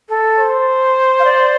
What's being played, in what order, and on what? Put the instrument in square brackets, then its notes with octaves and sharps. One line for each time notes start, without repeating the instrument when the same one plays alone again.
[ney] A4
[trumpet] C5
[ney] F5
D5